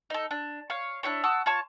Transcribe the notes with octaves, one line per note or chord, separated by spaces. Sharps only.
D#4 A4
D4
C#5 F5
D4 E4 G4 C#5
F#4 A5 D#6 E6
F4 C#5 A5 C#6